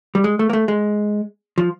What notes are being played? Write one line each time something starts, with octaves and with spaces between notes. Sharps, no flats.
G3
G#3
A3
A#3
A3
G#3
F3